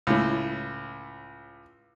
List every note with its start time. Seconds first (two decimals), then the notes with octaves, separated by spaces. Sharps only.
0.07 C#2 A2